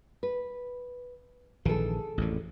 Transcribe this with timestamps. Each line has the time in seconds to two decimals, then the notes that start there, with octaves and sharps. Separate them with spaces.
0.23 B4
1.65 A#1 D#3 E3 G#4 A4
2.18 A1 F2 A#2